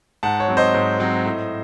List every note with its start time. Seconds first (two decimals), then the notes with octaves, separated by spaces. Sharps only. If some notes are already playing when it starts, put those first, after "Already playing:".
0.23 G#2 F#5 A5
0.40 C#5
0.48 F#3 C4
0.57 C5 D#5
0.74 G#2
1.00 F#3 C4
1.25 A2